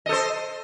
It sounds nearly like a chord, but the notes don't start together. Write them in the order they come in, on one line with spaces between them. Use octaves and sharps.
D#5 A4 C5